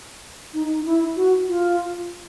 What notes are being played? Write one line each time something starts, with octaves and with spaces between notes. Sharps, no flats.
D#4
D#4
E4
F#4
F4